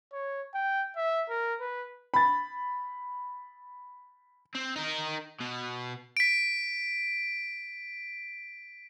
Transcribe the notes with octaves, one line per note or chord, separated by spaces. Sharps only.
C#5
G5
E5
A#4
B4
B5 A6
C4
D#4 A#4
B2
B6 D7